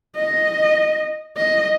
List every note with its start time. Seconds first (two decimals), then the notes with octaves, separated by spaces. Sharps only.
0.16 D#5
1.37 D#5